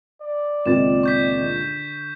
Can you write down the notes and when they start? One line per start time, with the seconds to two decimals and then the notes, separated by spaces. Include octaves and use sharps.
0.22 D5
0.66 C#2 A#2 D#3 B3 C4 A6 E7
1.03 C#6 G6 B6
1.40 D3